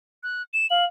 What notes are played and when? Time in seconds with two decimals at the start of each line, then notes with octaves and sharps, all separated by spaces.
0.23 F#6
0.54 E7
0.70 F5 F#7